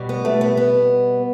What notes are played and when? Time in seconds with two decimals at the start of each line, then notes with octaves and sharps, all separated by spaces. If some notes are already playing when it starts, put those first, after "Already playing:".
Already playing: B2 G3
0.09 B3
0.25 A3
0.41 B3
0.57 B3